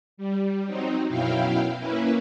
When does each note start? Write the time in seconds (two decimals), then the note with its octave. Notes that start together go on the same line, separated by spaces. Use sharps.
0.17 G3
0.67 F#3 C4 D#4
1.09 F#2 B2 F#3 E4 F5 G5
1.77 A#3 C#4 E4 B4